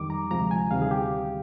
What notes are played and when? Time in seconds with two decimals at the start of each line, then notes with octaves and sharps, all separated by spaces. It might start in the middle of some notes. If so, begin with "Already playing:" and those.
Already playing: F2 D#3 G3 D6
0.10 A#5
0.31 D2 C3 F3 G#3 A#5
0.51 G#5
0.71 D2 C3 D#3 G3 F5
0.82 G#4
0.91 G4